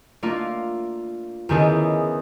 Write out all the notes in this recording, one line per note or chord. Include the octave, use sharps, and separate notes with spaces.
A3 A#3 D4 F4
E2 D#3 C#4 G#4 A4